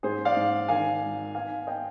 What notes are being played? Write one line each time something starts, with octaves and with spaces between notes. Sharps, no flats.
G#2 G#4 C5
D5 F5
G#2
D#3 F5 G#5
G#1
B3 F5 G#5
B3 D#5 G5